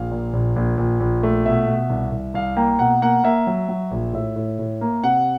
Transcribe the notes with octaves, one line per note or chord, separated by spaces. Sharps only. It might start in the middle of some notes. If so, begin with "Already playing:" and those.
Already playing: A#1 F5
A#2
A#1
A#1
A#1
A#1
A3
B2 E5
B2
C2
C2
C2 F5
A#3 G5
B2 F#5
A#3 F#5
A#3 E5
F#3
F#3
A#1
A2 E5
A2
A2
A#3
C3 F#5